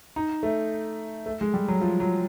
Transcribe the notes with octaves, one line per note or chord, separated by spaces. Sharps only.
D#4
A3
A3
G#3
G3
F#3
F3
F#3